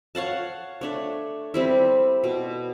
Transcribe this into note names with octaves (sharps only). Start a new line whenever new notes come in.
C#5 F5 F#5 A5
A3 D4 C#5
G3 C4 E4
B2